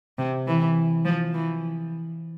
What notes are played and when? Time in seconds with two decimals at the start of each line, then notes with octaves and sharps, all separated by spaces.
0.18 C3
0.47 E3
1.05 F3
1.34 E3